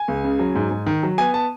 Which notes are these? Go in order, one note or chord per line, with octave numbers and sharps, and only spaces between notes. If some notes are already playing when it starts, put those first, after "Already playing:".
Already playing: G#5
C#2
C#3
F#3
G#2
G#2
D#3
F#3
B3 G#5
A5